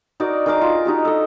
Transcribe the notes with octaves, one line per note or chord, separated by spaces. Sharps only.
D#4 F#4 A#4 D5
D#3 G#4 A#4 D6
F4
D#4 F#4 G4
A4 D#5